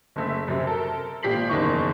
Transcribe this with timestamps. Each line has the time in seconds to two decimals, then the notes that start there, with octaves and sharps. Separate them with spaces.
0.16 F#1 A3 E5
0.48 F#2 C3
0.67 A4 A#4
1.23 G#1 A#2 G4 B6 C7 F#7
1.49 F#1 E2 D#3 D#4 C#6